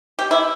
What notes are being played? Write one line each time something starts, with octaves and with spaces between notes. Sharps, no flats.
G4
E4